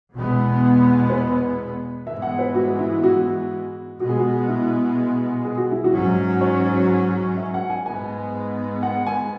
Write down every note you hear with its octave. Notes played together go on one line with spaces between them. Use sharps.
E2 B2 G#3 B3
B4
G#2 E3 G#3 B3 E5
F#5
B4
F#4
E4
F#4
B2 G#3 B3 F#4
G#4
F#4
E4
G#4
F#4
E4
F#4
G#2 F#3 C#4
C#5
E5
F#5
G#5
G#2 G#3 B3 G#5
F#5
G#5